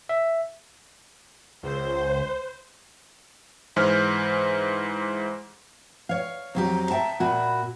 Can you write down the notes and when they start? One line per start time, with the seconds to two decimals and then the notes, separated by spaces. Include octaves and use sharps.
0.09 E5
1.63 C#2 C5
3.76 G#2 E3 G#3 C5 F6 G6
6.09 C#5 F5
6.55 F2 F#3 G4 A#5
6.91 E5 G5 A5
7.20 A#2 F#4 B5